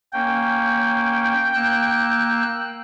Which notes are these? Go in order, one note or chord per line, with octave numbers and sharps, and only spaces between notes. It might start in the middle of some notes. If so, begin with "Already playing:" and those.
A#3 C#4 G5
A#3 E6 F#6